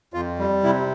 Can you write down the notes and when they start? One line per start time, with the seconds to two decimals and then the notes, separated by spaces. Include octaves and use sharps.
0.14 F2 F4
0.39 G3
0.63 C3 E4